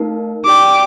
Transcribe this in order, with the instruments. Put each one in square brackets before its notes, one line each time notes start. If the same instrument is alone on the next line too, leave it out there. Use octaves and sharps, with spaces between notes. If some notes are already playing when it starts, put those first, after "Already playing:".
Already playing: [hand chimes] A3 D#4 A#4 F5 A5
[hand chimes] D#4 G4 D5 G5 [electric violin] D6